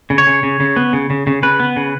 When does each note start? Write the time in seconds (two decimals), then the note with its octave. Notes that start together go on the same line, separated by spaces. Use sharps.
0.10 C#3
0.18 C#5
0.27 C#3
0.43 C#3
0.60 C#3
0.76 B3
0.93 C#3
1.10 C#3
1.27 C#3
1.43 C#3 B4
1.60 B3
1.76 C#3